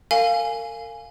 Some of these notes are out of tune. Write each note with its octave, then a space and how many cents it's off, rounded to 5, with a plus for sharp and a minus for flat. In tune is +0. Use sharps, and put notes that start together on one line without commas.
A#4 -40 F5 +0 G#5 +0